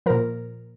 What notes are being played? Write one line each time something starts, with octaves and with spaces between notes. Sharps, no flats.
A#2 F3 A#4